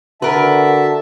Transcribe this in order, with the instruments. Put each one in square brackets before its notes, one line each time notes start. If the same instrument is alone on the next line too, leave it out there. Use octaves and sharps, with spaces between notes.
[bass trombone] D3 [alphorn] F#4 [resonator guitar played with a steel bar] A#4 B4 [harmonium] E5 A5